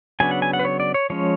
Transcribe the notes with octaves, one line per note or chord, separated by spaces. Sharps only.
C#3 F#3 B3 D4 G#5
F#5
G#5
F#5
B4
C#5
D5
C#5
F3 G#3 C#4 C#5